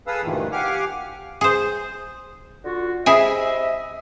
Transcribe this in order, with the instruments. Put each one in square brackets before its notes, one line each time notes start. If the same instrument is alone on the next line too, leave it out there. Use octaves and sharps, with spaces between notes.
[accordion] G#4 A4 B4 F5 D#6 E6
D2 G2 A#2 D#3 E3
G4 F5 F#5 G#5 D6 F6
[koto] G#4 C5
[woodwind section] D3 F4 F#4
[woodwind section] C3 D#5 E5 [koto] E4 G#4 G#5